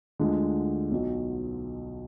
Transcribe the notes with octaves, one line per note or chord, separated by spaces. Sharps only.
D2 D3 G#3 F4
B1 B2 F#3